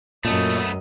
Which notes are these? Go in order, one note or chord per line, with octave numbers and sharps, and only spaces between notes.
F#2 A#2 A3 B3 D#5